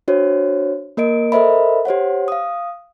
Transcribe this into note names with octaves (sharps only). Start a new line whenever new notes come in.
D4 F#4 C5 C#5
A#3 A#4 D#5 D7
A4 A#4 C5 D#5 E5 B5
G4 C5 C#5 F#5
F5 D#6